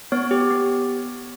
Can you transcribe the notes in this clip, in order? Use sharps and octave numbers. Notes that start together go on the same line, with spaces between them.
B3 C#5
G4
B3